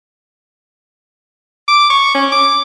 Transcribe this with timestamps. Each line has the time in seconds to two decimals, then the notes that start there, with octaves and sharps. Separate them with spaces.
1.68 D6
1.90 C#6
2.15 C#4
2.32 D6